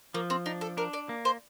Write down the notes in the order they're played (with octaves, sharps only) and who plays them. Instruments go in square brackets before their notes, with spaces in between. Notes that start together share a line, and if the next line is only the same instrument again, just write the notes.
[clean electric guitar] F3 [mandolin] A#3
[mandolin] C4
[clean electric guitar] D4 [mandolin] D#4
[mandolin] A4
[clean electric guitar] D4 [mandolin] A#4
[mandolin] D5
[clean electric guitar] A#3
[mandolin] C5